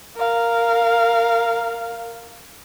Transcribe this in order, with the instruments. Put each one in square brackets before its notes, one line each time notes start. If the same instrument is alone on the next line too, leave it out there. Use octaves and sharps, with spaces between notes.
[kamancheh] A#4 F5